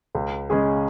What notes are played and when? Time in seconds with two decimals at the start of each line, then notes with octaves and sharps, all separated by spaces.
0.15 C#2
0.50 C#3 G#3 C#4 G#4